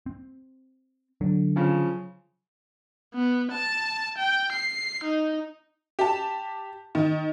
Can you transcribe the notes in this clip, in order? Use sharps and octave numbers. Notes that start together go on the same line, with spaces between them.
C4
D3 F#3
C#3 F3
B3
A5
G5
C7
D#4
G4 A5
D#3